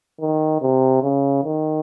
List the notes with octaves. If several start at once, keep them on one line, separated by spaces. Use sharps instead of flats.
D#3
C3
C#3
D#3